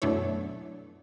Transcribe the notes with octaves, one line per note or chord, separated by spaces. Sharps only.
F#2 B2 A3 D4 E4 C#5